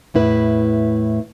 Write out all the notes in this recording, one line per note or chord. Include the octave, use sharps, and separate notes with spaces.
E2 A2 E4 B4